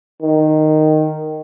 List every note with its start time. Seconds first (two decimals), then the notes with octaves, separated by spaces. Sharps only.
0.22 D#3